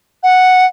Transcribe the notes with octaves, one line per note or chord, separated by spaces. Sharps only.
F#5